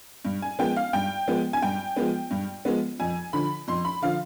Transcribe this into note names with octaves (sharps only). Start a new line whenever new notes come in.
G2
G#5
F3 G#3 B3 G5
F5
G2 G5
F3 G#3 B3
G#5
G2 G5
F3 G#3 B3
G2
F3 G#3 B3
F2 G#5
D3 F3 B5
F2 C6
B5
D3 F3 F5